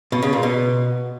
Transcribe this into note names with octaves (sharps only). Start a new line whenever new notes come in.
B2
C#3
A#2
B2